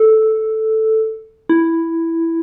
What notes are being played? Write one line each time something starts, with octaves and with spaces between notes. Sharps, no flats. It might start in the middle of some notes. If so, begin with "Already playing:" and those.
Already playing: A4
E4